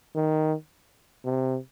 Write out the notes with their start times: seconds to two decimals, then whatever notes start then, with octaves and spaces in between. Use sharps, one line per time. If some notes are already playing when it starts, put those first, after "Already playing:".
0.15 D#3
1.25 C3